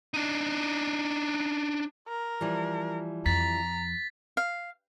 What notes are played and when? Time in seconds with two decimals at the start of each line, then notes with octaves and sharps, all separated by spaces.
0.14 D4 D#4
2.08 A#4
2.41 E3 F3 G3
3.26 F2 A#5 A6 B6
4.37 F5